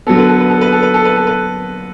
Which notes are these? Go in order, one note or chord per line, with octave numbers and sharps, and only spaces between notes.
D3 F#3 B3 A4
B4
A4
B4
A4
B4
A4
B4
A4
B4
A4
B4